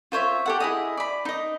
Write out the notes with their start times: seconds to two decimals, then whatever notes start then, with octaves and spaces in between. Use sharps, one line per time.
0.12 F4 C5 C#5 E5
0.46 G4 A4 F#5
0.60 E4 G#4 D#5
0.97 D5 B5
1.25 D#4 D#5